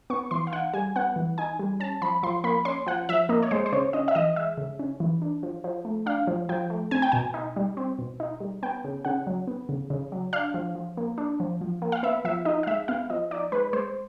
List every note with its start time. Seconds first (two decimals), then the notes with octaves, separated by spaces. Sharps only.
0.10 B3 C#6
0.31 E3 C6
0.47 F5
0.53 D#4 F#5
0.73 G3 G#5
0.96 B3 F#5
1.16 E3
1.38 D#4 G#5
1.59 G3
1.80 C#4 A5
2.02 F3 B5
2.23 F3 C6
2.44 A#3 B5
2.65 C#4 C6
2.87 F3 F#5
3.09 F3 E5
3.29 A#3 D#5
3.43 C#5
3.51 G#3 C5
3.66 C5
3.72 C#3 C#5
3.93 C#4 D#5
4.08 E5
4.15 E3 D#5
4.36 G#3 E5
4.57 C#3
4.79 C#4
5.00 E3
5.22 D4
5.43 F3
5.64 F3
5.85 A3
6.06 D4 F5
6.27 F3
6.49 F3 G5
6.70 A3
6.91 C4 G#5
7.02 G5
7.12 B2 G#5
7.34 D#4
7.56 G3
7.77 C4
7.99 B2
8.20 D#4
8.40 G3
8.63 B3 G5
8.84 C#3
9.05 C#3 F#5
9.27 F#3
9.47 B3
9.69 C#3
9.90 C#3
10.12 F#3
10.33 D4 F5
10.54 F3
10.75 F3
10.97 A#3
11.18 D4
11.40 F3
11.61 F3
11.82 A#3
11.92 F5
12.03 B3 E5
12.25 F3 E5
12.45 D#4 D#5
12.63 F5
12.67 G#3 E5
12.88 B3 F5
13.10 F3 D#5
13.31 D#4 D5
13.52 G#3 B4
13.73 G#3 C5